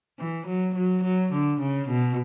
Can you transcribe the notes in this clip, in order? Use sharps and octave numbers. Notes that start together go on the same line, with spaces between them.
E3
F#3
F#3
F#3
D3
C#3
B2